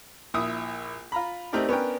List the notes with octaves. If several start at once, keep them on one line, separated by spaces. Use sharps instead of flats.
A#1 E4 D#6
F4 A#5 B5
A3 C4 D#4 G4 A#4 D5
B3 C#4 D4 A#4 G5